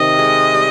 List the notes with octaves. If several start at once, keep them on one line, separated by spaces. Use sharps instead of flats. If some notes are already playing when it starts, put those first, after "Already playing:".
Already playing: C3 D#3 D#5
G#3
G3